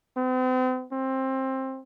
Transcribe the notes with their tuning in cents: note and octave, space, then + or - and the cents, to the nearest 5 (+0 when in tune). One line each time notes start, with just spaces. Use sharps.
C4 -40
C4 +20